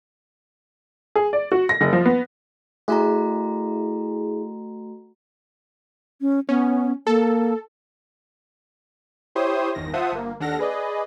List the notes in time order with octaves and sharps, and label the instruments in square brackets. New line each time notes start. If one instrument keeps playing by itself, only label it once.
[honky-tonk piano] G#4
D5
F#4
A#6
F#1
F3
B3
[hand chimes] A3 F#4 A#5 [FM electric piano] E4 G#4
[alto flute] C#4
[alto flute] B3 [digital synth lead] C#4
[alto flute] A#3 [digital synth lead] A4
[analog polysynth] E4 G4 C5 C#5 D#6
G1 E2 D#3 A#6
F4 C5 E5 F#5 A5 D#6
G1 A#3
D#2 D4 A4 F#5 F6 A#6
G#4 B4 D5 D#5